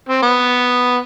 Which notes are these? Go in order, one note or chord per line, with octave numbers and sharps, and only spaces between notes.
C4
B3